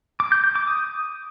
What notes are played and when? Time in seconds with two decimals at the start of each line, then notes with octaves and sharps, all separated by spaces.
0.20 D6
0.32 G6
0.44 G6
0.55 D6
0.67 D#6